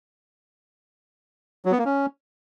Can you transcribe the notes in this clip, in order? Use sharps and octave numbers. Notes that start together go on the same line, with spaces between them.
F#3
B3
A#3
C#4